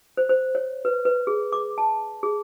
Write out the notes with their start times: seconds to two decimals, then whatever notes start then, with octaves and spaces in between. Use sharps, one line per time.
0.17 C5
0.29 C5
0.55 C#5
0.85 B4
1.05 B4
1.27 G#4
1.53 D6
1.78 A5
2.23 G#4